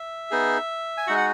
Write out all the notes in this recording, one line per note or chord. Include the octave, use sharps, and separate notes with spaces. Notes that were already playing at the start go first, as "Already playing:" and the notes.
Already playing: E5
B3 D#4 G#4
G#5
G#3 D#4 F#4 F#5
F#5